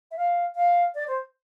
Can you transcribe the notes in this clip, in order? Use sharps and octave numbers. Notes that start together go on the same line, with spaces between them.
E5
F5
F5
D5
C5